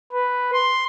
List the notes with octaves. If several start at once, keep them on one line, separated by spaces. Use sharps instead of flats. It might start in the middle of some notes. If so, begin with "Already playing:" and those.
B4
C6